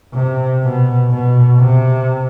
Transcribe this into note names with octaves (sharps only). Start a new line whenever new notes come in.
C3
B2
B2
C3